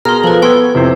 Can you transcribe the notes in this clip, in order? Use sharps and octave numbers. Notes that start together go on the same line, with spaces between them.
B2 G#4 A#4 A#5 C6 F6
F3 A4 B4
B3 G5 C6 C#6 E6 G#6
F2 C3 E4 C5